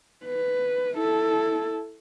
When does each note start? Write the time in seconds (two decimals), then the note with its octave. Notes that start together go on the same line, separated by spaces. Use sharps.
0.24 B4
0.95 E4 A4